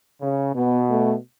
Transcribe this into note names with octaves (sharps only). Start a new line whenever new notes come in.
C#3
B2 B3
A3